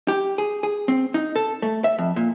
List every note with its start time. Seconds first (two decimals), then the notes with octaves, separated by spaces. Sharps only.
0.08 G4
0.38 G#4
0.63 G#4
0.88 C4
1.14 D#4
1.36 A4
1.62 A3
1.84 E5
1.98 F2
2.16 A#2